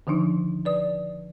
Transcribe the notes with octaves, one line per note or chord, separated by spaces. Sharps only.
D3 D#3 F3 D4 D#4
B4 D5 D#6